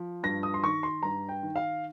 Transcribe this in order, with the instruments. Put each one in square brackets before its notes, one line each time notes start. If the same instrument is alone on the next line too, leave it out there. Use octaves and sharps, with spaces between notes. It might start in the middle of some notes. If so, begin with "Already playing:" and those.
Already playing: [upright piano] F3
G2 A#6
D#6
C6
D#3 C#6
C6
G2 A#5
G5
D#3
F5